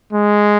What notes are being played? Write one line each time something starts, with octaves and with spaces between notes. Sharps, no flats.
G#3